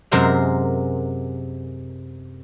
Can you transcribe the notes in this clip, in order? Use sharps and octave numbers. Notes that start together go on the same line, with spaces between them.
F#2 C3 G#3 A#4 C5 E5